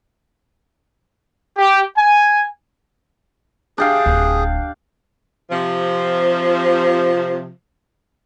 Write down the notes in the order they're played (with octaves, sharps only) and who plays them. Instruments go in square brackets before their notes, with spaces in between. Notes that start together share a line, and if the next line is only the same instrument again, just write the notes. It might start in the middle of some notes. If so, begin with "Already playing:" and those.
[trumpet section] G4
G#5
[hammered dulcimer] D4 G4 F5 [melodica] G#4
[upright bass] D1
[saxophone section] C3 F3